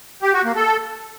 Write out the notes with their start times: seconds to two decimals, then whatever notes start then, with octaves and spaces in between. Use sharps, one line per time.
0.22 G4
0.33 F#4
0.44 A#3
0.55 A4